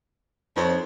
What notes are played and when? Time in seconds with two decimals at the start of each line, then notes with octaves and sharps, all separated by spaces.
0.56 F2 D#4 C5 C#5